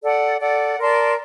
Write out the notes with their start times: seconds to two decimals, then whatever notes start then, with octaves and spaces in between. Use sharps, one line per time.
0.03 A4 D5 F#5
0.41 A4 D5 F#5
0.78 A#4 D5 A5 C6